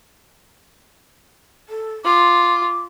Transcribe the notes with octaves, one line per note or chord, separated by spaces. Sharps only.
A4
F4 D6